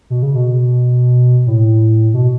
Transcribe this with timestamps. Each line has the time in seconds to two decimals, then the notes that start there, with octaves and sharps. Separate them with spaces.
0.10 B2
0.23 C#3
0.35 B2
1.47 A2
2.14 B2